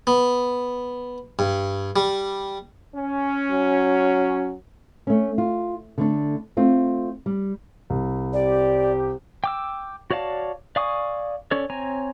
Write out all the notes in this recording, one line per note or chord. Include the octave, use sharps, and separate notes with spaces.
B3
G2
G3
C#4
F#3
A3 C#4
F4
D3 A3 D4
A3 C4 F4
G3
C2
C4 G4 D5
G5 D6 E6
F#4 C#5 D5 F5 A5
D5 F5 G#5 C#6 D#6
C#4 A4 C#5 D5
C4 C#5 G#5 A#5